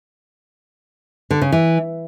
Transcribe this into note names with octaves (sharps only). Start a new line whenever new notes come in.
D3
C#3
E3